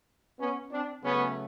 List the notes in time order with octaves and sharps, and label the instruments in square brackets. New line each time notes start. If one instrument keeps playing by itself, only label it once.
[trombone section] B3 C#4
C4 D4
C#3 F#3 A3 B3 C#4